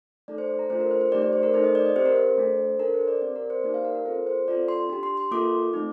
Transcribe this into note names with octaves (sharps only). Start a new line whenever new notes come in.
A3 D#4 A4 D5
C5
A#5
A3 D4 F4 A4 C5
A#4
C5
C5
A3 D#4 G4 D5
D5
C5
A#4
A3 D#4 A4 C5
D#5
D5
D#5
C4 G4 C5
A#4
C5
A3 D4 A4
D4 A4 A#4
C5
D5
C4 G4 D5
A#4
C5
A#3 D#4 G4 D5
F5
A#4
A#4
C4 F4 A4 C5
C5
C4 F4 A4 D5
C6
D4 G4 C6
C6
C6
A#3 F4 A4 D6
A3 C4 D#4